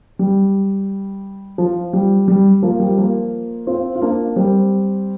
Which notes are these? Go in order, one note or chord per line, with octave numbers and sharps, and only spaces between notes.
G3
F3
G3
G3
F3 A#3
G3
F3 A#3
C4 F4
F4
A#3 D4
G3 C4